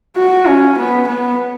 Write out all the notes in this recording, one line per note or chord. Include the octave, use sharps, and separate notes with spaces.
F#4
C#4
B3
B3